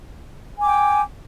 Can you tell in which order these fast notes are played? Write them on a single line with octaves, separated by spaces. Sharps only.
G#5 D6 G5